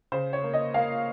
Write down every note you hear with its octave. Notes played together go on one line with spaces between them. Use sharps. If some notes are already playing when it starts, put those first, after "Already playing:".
C#3 C5
C#5
A#3
D#5
A#3 F5